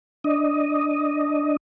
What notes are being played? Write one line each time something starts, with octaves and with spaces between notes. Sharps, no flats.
D4 D#5